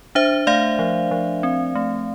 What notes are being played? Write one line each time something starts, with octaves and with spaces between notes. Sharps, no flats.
D4 C5 E5
A3 D5 F5
F3
F3
C4
A3